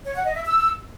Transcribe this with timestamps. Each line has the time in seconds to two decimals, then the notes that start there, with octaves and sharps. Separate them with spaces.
0.05 C#5
0.15 F#5
0.25 D#5
0.35 E5
0.45 E6